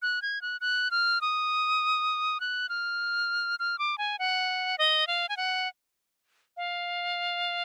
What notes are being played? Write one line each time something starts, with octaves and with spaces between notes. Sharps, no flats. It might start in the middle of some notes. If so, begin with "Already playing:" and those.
F#6
G#6
F#6
F#6
F6
D#6
F#6
F6
F6
D6
G#5
F#5
D#5
F5
G#5
F#5
F5